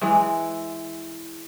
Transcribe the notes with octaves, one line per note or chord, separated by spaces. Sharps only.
E3 G#3